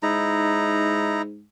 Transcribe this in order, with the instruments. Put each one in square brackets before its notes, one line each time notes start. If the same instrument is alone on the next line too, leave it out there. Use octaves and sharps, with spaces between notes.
[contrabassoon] G#2 [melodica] D#4 E4 A#5